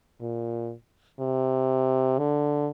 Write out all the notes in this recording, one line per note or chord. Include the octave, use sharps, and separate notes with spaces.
A#2
C3
D3